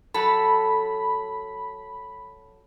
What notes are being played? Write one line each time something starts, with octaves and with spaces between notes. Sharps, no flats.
F#3 A4 B5